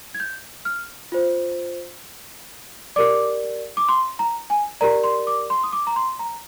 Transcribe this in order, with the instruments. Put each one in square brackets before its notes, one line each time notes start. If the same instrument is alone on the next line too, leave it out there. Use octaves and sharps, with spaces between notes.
[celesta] G#6
G6
F6
F4 C5
G4 A#4 D5 D6
D6
C6
A#5
G#5
G4 A#4 D5 A#5
C6
D6
C6
D#6
D6
A#5
C6
A#5